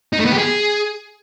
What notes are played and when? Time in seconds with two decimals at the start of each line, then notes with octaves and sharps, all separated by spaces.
0.13 D#4
0.19 A3
0.25 B3
0.32 G4
0.38 G#4